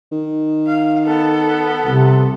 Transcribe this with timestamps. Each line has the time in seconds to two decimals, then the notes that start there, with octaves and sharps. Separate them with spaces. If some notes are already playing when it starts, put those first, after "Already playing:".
0.12 D#3
0.67 F5
1.05 B3 A4
1.85 C2 C3